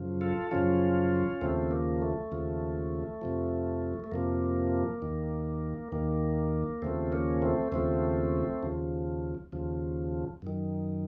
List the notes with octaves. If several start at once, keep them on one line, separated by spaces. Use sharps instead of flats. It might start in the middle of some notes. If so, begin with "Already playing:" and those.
Already playing: F#2 C#3 F3
F4 A4
F#2 C#3 F3 C#4 F4
D#2 C#3 F3 A3 C4
A#3
A3
D#2 C#3 F3
F2 C3 F3
A3
F2 C3 F3 A#3
D#2 D#3
D#2 D#3 A#3
D#2 C#3 F3 A3 C4
A#3 C#4
A3 C4
D#2 C#3 F3 A3 C4
D#2 C#3 F3
D#2 C#3 F3
F#2 D#3